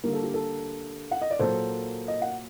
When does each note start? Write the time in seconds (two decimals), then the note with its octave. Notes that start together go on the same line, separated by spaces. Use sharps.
0.03 D3 G3 A#3 A#4
0.13 A4
0.23 G4
0.34 A4
1.11 F#5
1.22 D#5
1.31 D5
1.39 A#2 F#3 A#3 A4 C5
2.08 D#5
2.22 F#5